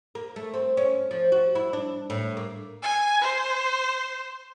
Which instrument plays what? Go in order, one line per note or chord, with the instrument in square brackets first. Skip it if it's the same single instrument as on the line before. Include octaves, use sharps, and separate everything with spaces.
[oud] A#3
A3
C4
C#4
F3
F#4
E4
D4
A2
A#3
[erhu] G#5
C5